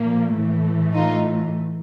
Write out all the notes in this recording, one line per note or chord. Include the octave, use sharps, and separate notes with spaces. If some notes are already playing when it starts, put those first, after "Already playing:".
Already playing: A#2 F3 A#3
A2 E3 A3
D#4 F4